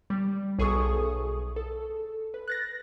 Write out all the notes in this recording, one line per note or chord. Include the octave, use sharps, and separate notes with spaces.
G3
B1 G#4 A4 C#6 D#6
A4
B4
F#6 A6 A#6